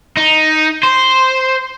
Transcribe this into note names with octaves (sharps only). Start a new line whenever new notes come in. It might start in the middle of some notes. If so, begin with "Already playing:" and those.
D#4
C5